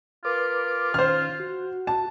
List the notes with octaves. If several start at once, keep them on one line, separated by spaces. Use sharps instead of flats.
F4 A#4 B4 D6
D#3 C#4 C5 F6
F#4
A5